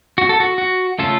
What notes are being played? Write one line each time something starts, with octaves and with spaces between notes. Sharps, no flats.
F#4
A4
F#4
F#4
C#3 A3 C#4 F4 A4